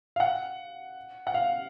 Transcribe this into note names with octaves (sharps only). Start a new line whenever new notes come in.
F5
F#5
F#5
F5